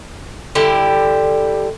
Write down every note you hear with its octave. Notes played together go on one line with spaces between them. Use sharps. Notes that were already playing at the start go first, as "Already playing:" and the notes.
D3 G3 E4 G4